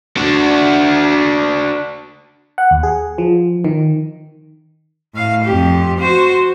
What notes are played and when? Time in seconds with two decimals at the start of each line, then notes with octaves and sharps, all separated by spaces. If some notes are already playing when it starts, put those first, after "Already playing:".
0.17 D4 F#4
2.58 F#5
2.71 D#2
2.83 G#4
3.18 F3
3.64 D#3
5.14 A2 F5
5.45 F2 G4
5.99 F#4 C5